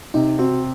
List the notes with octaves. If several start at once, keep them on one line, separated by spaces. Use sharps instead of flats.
C3 D#4
C4 F#4